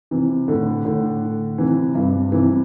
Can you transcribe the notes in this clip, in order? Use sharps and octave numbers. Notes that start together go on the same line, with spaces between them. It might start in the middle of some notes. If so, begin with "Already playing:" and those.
C3 E3
A2 D3
A2 D3
C3 E3
G2 C3
C3 E3